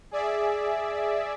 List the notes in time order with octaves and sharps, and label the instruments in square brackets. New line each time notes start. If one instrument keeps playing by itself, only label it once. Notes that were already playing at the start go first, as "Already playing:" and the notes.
[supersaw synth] G#4 D5 E5